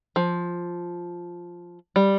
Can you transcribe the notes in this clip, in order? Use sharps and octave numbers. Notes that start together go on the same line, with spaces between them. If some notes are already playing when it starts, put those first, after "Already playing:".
F3
G3